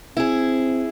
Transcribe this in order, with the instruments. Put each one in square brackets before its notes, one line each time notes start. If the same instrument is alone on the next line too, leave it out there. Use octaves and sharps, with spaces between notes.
[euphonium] C4 [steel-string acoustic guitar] E4 G#4